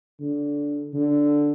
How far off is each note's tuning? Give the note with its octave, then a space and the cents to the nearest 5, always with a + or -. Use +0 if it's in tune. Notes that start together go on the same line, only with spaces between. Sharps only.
D3 -15
D3 -5